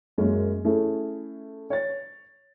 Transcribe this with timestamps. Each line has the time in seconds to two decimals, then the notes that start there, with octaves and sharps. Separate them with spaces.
0.18 F#2 G#3 A#3 C#4
0.65 A3 C#4 E4 G#4
1.70 C#5 A6